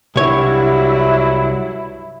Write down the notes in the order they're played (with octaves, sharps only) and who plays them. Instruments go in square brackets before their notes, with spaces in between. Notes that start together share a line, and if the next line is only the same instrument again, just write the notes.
[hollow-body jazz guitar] C2 C#5 [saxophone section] G2 F#3 [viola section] E4